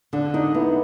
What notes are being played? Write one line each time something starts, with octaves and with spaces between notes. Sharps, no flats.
D3 D4
D4 D#4
B3 E4